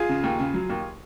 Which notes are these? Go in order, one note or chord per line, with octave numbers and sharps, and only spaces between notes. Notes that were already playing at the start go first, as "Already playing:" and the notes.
Already playing: F4 G#4
C#3
D#2
C#3
F#3
D#2